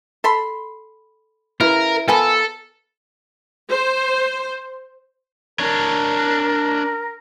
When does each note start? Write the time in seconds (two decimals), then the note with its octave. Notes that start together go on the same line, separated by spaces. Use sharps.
0.24 A4 B5 C6
1.61 C#3 E4 A#4 B4
2.08 F3 B3 A4 A#4 G#5
3.69 C5
5.60 D4 A#4 C#5